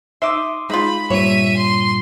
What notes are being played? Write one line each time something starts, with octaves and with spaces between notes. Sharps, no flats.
D#4 E5 C6 D6 D#6
G#3 D#4 F4 B5
G2 A#2 C#5 E5 D#7
C6